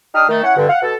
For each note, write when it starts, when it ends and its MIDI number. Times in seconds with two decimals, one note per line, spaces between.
0.14 0.25 62
0.14 0.25 63
0.14 0.25 67
0.14 0.25 87
0.14 0.25 89
0.29 0.43 51
0.29 0.43 57
0.44 0.53 61
0.44 0.53 64
0.44 0.53 73
0.44 0.53 78
0.57 0.69 43
0.57 0.69 50
0.69 0.80 77
0.69 0.80 78
0.82 0.96 47
0.82 0.96 69